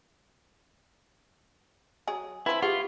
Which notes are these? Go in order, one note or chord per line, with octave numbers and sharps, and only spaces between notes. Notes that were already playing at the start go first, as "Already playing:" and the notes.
F#3 G#4
F3 C4 E4 B4
F4 G4 G#4 F#5